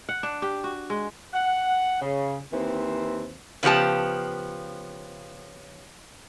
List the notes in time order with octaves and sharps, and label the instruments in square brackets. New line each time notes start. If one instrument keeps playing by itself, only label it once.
[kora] F#5
D4
G4
F#4
G#3
[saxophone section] F#5
C#3
D#2 E3 C4
[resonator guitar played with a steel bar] C#3 F3 B3 G4 A5